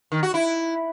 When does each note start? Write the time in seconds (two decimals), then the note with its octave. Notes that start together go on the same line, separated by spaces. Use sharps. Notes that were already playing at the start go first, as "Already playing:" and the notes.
0.12 D#3
0.23 F#4
0.34 E4